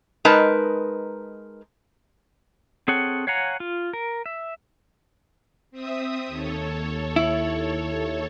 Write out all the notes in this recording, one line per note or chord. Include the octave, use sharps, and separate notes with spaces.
G#3 D#4 A#4 B4 A5
C4 G#4 A4 C#5 F#5
C#5 F5 F#5 G#5 A#5
F4
A#4
E5
C4 E5 D#6
D#2 A4 C#5
E4